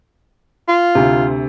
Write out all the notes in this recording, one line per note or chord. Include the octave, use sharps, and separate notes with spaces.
F4
D2 C3